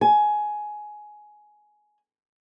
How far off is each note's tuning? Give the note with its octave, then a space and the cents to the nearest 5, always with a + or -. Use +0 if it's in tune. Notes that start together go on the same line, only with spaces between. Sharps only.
G#5 +15